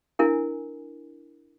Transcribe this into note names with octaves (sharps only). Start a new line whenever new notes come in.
D4 E4 A#4 G#5